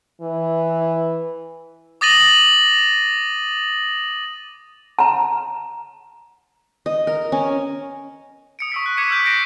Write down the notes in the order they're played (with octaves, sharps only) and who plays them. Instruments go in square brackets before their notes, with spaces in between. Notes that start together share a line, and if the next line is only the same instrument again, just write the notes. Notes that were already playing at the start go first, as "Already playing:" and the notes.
[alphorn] E3
[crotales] D6 D#6 A6 A#6 D#7 F#7
[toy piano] A5 A#5
[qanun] D#5
A#4
C#4
[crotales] D#6 C#7 D7
C#6 E6 B6
C#6 F#6
D6 G#6 B6 C#7 D#7
E6 F6 G6 B6 D7
G6 A#6 C7 D7 D#7